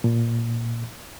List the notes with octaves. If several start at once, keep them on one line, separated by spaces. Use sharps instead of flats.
A#2